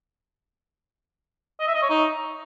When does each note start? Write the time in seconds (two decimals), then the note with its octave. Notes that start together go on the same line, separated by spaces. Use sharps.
1.60 D#5
1.67 E5
1.75 D#5
1.82 C#5
1.90 D#4